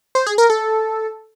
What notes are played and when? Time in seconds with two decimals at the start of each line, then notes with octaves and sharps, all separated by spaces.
0.15 C5
0.27 G#4
0.38 A#4
0.50 A4